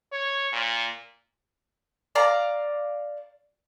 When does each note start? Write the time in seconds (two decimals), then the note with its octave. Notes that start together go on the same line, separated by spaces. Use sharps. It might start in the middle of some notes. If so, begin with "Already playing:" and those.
0.12 C#5
0.53 A#2
2.15 D5 F5 A#5